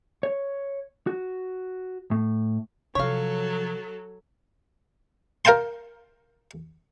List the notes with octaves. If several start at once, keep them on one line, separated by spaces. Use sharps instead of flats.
C#5
F#4
A2
C3 F3 F#3 A4 C#5 F5
A#4 F5 G5 A5 C6